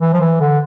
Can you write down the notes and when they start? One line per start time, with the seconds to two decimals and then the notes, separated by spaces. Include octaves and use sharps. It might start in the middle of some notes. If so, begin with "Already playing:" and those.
0.01 E3
0.13 F3
0.20 E3
0.40 D3